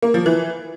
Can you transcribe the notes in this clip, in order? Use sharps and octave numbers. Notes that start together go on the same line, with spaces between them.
A#3
F3
E3